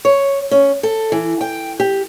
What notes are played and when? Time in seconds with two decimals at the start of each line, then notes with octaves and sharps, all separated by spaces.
0.05 C#5
0.51 C#4
0.83 A4
1.12 E3
1.41 G5
1.80 G4